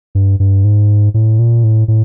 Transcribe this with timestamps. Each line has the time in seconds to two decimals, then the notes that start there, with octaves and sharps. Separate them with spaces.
0.15 G2
0.40 G2
0.64 G#2
1.14 A2
1.39 A#2
1.64 A2
1.88 A2